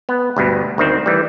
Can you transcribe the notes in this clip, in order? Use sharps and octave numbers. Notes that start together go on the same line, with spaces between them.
B3
D2 G2 B2
D2 D#3 C4
E3 G3